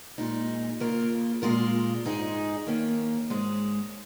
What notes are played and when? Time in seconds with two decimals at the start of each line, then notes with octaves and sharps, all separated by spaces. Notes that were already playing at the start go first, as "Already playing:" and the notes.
0.18 A#2 G#3 D#4
0.80 C#3 A#3 F4 A#4
1.42 A#2 G#3 F4 A#4
2.05 G#2 G#3 D#4 G#4
2.66 D#3 A#3 C#4
3.29 G#2 G#3 C#4 G#4